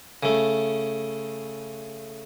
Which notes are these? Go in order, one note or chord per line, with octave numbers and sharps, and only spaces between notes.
C#3 A3